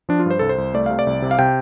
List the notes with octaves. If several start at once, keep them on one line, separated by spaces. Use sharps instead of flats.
F3 D4
F4
G2 C5
C2 A4
C5
C2
A3 D5
C3 F5
D5
C2
C3
F5
C3 G5